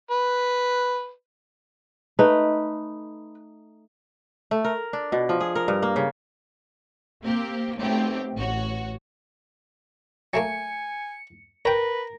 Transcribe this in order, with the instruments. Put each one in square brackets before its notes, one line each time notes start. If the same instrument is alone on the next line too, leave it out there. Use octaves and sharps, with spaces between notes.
[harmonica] B4
[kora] A3 D#4 [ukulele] B4
[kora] A3
A#4
D4
B2
F3
G#4
A#4
G2
A#3
C#3
[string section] A#3 C4 G4
B1 A3 C4 G4
A1 F#4 C#5
[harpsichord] F#3 A3 A#3 [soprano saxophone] G#5 [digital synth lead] C#7
[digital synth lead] A#4 [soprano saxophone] B4 [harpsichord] C#5 G5